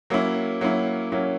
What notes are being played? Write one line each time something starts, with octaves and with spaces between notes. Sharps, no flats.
F#3 A#3 C#4 E4
F#3 A#3 C#4 E4
F#3 A#3 C#4 E4